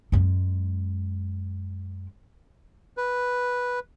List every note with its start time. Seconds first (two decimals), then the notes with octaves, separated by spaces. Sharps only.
0.12 F#2 G#3
2.97 B4